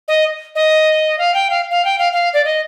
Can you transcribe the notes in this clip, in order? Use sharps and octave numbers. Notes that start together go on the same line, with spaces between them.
D#5
D#5
F5
G5
F5
F5
G5
F5
F5
D5
D#5